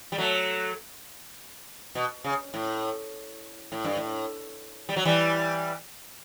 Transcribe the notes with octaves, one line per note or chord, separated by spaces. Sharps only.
G3
F#3 A3
B2
C#3
A2
A2
G2
A2
G3
F#3
E3 G3